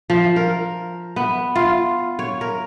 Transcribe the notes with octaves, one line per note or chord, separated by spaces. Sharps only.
F3
A#4
B3
F4
C#5
A#4